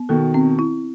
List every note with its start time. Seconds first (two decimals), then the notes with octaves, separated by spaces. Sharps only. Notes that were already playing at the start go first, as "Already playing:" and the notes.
Already playing: B3
0.09 B2 D#3 A4
0.34 C4
0.59 E4